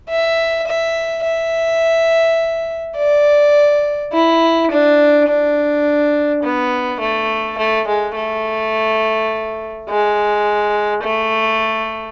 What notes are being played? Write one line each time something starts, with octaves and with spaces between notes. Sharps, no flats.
E5
E5
E5
D5
E4
D4
D4
B3
A3
A3
G#3
A3
G#3
A3